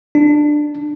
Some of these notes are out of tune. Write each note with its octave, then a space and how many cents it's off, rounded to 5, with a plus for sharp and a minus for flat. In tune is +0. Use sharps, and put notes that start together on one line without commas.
D4 +15